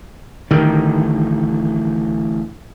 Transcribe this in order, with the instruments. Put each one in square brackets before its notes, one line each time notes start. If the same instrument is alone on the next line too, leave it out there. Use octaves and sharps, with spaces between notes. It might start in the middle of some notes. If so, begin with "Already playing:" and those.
[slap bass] A1 D3 G3 [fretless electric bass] D#3